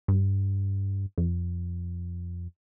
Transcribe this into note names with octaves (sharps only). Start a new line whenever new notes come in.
G2
F2